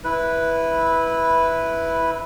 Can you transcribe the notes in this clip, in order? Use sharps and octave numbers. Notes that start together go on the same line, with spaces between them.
E4 B4